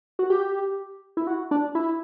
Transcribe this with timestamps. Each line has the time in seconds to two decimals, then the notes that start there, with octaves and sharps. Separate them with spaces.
0.19 F#4
0.30 G4
1.17 E4
1.27 F#4
1.51 D4
1.75 E4